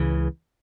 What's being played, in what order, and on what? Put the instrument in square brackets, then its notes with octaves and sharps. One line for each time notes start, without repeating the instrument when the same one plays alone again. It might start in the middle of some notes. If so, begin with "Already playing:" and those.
Already playing: [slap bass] C#2 C#3 E3